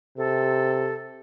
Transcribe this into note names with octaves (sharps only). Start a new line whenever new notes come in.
C3 A4